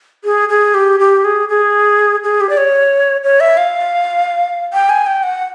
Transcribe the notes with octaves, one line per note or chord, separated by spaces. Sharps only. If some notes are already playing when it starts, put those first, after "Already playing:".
G#4
G#4
G4
G4
G#4
G#4
G#4
G4
D5
C#5
C#5
E5
F5
G5
G#5
G5
F#5